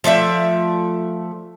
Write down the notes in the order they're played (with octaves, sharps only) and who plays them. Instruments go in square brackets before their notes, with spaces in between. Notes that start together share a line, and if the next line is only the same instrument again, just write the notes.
[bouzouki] F3 A3 D5 E5